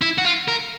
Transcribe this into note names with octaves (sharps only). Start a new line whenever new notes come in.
E4
F#4
F4
A#4